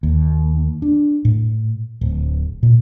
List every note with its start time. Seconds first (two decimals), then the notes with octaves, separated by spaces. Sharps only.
0.03 D#2
0.82 D4
1.25 A2
2.01 D1
2.63 A#2